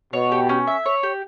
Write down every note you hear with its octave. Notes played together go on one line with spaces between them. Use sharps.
B2 C#5
G4
C#4
E5
C#5
G4